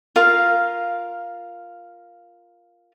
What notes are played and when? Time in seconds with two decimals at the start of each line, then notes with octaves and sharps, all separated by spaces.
0.16 F4 A#4 F5